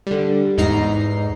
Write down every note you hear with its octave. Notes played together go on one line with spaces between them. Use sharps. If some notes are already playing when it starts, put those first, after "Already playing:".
D3 G3
E2 G#2 D#4 A#5 C7